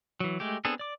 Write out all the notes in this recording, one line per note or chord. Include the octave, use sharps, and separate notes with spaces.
E3 F#3
G#3 A3 G4
B3 C4 D4 G#4 A4
D5 D6